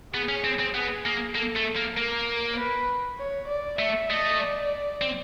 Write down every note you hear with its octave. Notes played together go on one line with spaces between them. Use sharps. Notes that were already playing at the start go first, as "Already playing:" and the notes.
B3 G#4
C#4
C4
C4
B3 G#4
A#3
A#3 A4
A3
A#3
A#3 A#4
B4
C#5
D5
A3 E5
A3 D#5
D5
C4